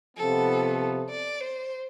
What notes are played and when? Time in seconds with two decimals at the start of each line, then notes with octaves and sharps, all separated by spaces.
0.17 C3 F3 B3 A4
1.10 D5
1.41 C5